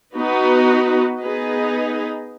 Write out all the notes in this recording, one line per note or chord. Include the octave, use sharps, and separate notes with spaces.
B3 D#4 F#4 B4
B3 D#4 G#4 B4 D#5